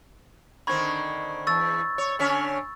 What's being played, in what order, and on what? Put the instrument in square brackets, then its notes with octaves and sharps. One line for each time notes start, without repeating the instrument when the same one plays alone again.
[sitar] D3 D#3 C4 [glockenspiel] B5 C#6 G#6
[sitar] E2 [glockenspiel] C#6 E6 A6
[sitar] C#5
D3 C#4 C#5